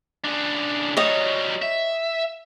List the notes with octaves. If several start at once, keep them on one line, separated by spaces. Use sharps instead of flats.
C#3 D4
F#3 G3 C#5 D#5
E5